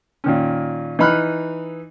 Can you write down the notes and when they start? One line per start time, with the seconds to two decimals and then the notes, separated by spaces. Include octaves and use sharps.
0.24 A#2 D#3 C#4
0.99 E3 D#4 B5 F6 F#6